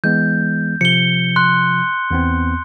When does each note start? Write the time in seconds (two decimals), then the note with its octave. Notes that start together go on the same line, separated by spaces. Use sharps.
0.04 E3 G#3 B3 G6
0.81 C3 F3 C#7 G7
1.36 C6 F#6
2.11 E2 B3 C4